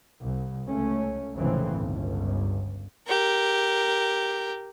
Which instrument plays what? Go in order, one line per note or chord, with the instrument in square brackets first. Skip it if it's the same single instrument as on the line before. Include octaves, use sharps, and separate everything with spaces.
[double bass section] C2
C#2 A3 C#4
F1 C#2 A2 C#3 E3 C4
G1 C#2
[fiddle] G4 A#4